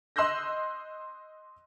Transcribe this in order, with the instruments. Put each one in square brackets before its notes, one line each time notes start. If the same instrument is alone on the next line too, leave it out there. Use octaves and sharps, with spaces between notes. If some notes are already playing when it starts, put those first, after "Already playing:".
[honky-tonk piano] D#5 C6 E6 F#6 G6 A#6